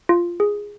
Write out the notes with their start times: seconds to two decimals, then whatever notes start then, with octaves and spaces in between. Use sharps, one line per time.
0.09 F4
0.40 G#4